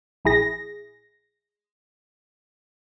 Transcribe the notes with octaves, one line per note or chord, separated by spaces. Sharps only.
A#1 E4 G#4 A#6